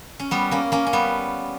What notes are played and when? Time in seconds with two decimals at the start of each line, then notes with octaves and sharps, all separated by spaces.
0.20 C#4
0.31 G3 B3
0.51 A#3 C#4
0.72 A#3 C#4
0.87 C#4
0.93 G3 B3